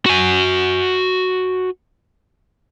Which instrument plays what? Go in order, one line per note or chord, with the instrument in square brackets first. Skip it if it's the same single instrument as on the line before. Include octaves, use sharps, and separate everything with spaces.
[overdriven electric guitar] F#4 G#5